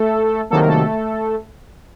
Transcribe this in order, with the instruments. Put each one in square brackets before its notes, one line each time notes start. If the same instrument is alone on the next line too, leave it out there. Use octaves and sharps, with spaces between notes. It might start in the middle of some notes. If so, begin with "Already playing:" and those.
Already playing: [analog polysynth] A3 A4
C2 C3 D#3 F#3 A#3 A4
A#4
A3 A4